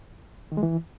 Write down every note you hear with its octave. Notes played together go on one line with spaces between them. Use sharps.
D#3
G#3
E3